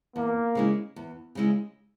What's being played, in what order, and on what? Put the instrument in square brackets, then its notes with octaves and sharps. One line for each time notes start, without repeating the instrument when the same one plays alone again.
[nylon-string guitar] E2 [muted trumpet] A#3
[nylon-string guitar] C#3 G#3 C#4 E4
E2
C#3 G#3 C#4 E4